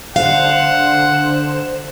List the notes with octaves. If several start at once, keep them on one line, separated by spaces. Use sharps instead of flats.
D3 C5 F5 F#5 E7